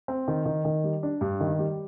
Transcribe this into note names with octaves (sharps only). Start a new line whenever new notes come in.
C4
D#3
D#3
D#3
G3
D4
G2
D#3
G3